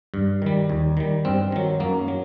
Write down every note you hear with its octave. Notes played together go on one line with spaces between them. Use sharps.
G2
D#3 G3
D#2
D#3 G3
G2 C4
D#3 F#3
F#2 A#3
F#3